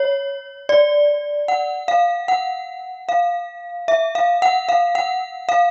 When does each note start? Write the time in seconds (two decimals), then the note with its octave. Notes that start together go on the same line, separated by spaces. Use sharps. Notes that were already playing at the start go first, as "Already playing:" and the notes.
Already playing: C#5
0.69 D5
1.48 F#5
1.88 F5
2.28 F#5
3.09 F5
3.88 E5
4.15 F5
4.42 F#5
4.69 F5
4.95 F#5
5.49 F5